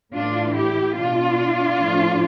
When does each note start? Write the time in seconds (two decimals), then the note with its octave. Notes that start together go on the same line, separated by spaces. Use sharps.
0.14 A2 E3 D4 F4
0.55 E4 G4
0.96 B2 D4 F4
1.78 A2 F3